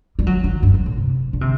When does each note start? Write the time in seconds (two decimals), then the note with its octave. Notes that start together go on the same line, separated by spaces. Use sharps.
0.19 G3
0.27 F#3
0.44 D3
0.63 G2
0.74 F#2
0.86 A2
0.98 C3
1.33 D3
1.41 C3